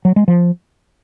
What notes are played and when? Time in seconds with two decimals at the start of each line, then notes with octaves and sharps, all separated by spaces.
0.05 F#3
0.16 G#3
0.28 F3